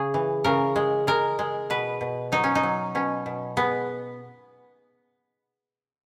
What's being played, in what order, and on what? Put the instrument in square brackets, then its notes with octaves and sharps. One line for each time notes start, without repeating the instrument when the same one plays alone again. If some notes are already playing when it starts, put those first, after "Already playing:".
Already playing: [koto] C#3 G#4
E3
C#3 A#4
G#3
G#3 A#4
G#3
B2 B4
B2
F#3 D#4
C#4
D#4
F#3
B2 C#4
B2
G#3 B3